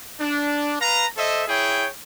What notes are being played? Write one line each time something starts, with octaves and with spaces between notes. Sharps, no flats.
D4
B4 F5 A#5
A4 C5 D#5 E5
E4 G#4 C#5 G5